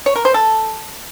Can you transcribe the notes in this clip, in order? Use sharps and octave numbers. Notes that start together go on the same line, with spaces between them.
C#5
A#4
C5
A4